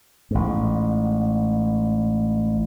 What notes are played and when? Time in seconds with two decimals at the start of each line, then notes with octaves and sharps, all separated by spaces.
0.31 A1 G#2